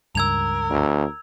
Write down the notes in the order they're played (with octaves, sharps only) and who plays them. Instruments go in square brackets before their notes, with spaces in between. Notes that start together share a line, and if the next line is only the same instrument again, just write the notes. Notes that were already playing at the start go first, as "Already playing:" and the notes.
[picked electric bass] C#2 G2 [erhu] A#4 [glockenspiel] E6 G#6 F7
[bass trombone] D2